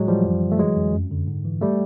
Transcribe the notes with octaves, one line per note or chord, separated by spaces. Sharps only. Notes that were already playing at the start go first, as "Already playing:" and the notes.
Already playing: A2 F#3 G#3
E3 F3 G3
F#2
D3
A3
E3 F#3 G#3
F2
F#2
D3
G#2
E3
G3 A3